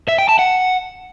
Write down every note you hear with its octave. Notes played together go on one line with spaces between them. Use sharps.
E5
G5
A5
F#5